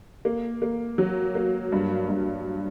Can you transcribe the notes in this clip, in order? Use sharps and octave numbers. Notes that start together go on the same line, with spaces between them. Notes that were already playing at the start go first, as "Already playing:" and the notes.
A#3
A#3
F#3
A#3
G2
G2